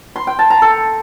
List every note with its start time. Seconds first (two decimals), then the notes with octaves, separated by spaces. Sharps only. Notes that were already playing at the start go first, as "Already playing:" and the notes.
0.16 C6
0.27 G5
0.39 A5
0.50 A#5
0.62 A4